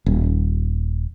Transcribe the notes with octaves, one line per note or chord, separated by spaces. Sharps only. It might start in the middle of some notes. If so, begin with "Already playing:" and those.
D#1